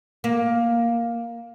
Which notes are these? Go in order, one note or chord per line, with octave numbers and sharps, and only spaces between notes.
A#3